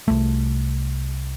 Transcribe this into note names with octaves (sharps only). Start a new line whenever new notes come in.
C2 A3